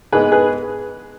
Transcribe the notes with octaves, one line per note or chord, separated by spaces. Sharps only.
G#2 G#3 B3 G#4 B4
G#4 B4